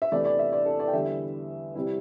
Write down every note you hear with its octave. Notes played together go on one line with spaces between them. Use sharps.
E5
E2 C3 E3 A3 D5
D5
E5
D5
A4
D5
G5
E2 D3 G3 E5
C3 G3 E4